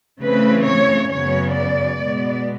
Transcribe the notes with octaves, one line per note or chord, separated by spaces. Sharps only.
C#3 E3 A3 C4 B4
C#5
F#2 C#3 F#3 B3 C#5
D5
B2 G#3 B3